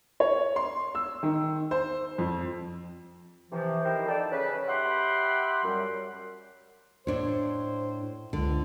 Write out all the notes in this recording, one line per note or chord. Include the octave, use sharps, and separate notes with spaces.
C#5
C6
E6
D#3
C5
F2
C3 E3 F3
D#4 E4 G4 A#4 C5
F2 D#4 A4 D5
C#3 B4
G4 E5 F#5 G5 B5 C6
F#2 G3
A2 D4 C5 C#5
C#2 D3